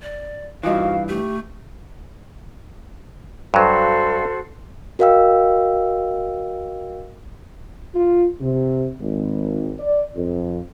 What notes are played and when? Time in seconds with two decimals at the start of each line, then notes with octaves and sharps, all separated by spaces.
0.02 D5
0.63 G2 E3 D#4 F4 F#4 D#5 F5
1.09 A3 G4
3.54 G2 F#3 F#4 A4 C5
4.99 F#4 A#4 D#5 F5 G5 E6
7.95 F4
8.40 C3
9.00 G#1
9.79 D5
10.16 F2